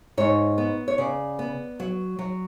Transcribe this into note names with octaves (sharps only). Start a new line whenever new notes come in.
G#2 C#5
B3
C#5
C#3 D5
B3
F#3
F#3